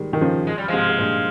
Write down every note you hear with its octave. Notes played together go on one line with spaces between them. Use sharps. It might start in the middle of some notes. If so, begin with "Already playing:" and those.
Already playing: D#3 G3 G#3
D#3
C#3 F3
G#3
G3
G#2 C3 F3 G#3
G#2
G2 A#2